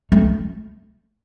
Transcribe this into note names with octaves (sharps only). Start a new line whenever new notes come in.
A3